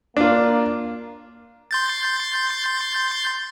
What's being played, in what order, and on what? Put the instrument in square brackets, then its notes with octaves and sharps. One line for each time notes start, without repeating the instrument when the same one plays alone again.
[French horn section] A#3 [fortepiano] D4 F4
[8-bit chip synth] C6 G6 A6